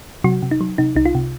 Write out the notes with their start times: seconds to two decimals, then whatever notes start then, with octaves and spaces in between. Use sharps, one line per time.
0.24 C3 F#3 F#4
0.42 C3
0.51 D#4
0.61 F#3
0.78 C3 D#4
0.95 C2 D#4
1.05 F4
1.15 C3